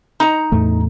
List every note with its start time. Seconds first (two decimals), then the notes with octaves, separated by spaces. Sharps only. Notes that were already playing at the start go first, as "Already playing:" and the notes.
0.20 D#4 A#5
0.52 E2 A2 A3